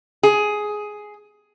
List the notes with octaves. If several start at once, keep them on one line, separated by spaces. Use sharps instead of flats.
G#4